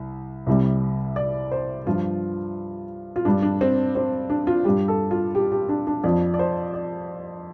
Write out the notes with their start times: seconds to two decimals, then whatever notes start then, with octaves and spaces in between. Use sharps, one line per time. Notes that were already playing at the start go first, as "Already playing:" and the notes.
Already playing: C2
0.46 C2 C3 G3
1.16 D5
1.52 C5
1.86 G2 F3 F4
3.16 F4
3.25 G2 G3 D4
3.42 D4
3.61 C4
3.95 C4
4.30 D4
4.47 F4
4.64 G2 G3 G4
4.88 A4
5.11 F4
5.35 G4
5.52 G4
5.69 D4
5.87 D4
6.04 F2 F3 D5
6.34 D5
6.39 C5
6.74 D5